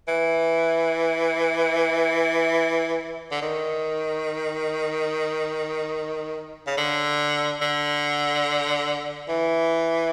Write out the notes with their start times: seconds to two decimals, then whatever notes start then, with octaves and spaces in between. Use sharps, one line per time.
0.08 E3
3.31 D3
3.42 D#3
6.67 C#3
6.77 D3
7.61 D3
9.29 E3